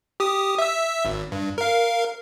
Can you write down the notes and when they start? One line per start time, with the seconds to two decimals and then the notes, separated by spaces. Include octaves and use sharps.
0.20 G4 D#6
0.58 E5 E6
1.05 G#1
1.32 G2
1.58 A#4 F5